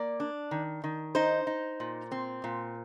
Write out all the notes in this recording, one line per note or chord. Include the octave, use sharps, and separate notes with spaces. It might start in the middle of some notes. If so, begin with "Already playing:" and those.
Already playing: A#3 D5
D4
D#3
D#3
D#4 C5
D#4
A#2
C4
A#2